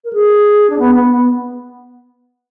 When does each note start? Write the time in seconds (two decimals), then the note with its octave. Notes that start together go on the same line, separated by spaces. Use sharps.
0.04 A#4
0.13 G#4
0.70 D4
0.79 B3
0.95 B3
1.12 B3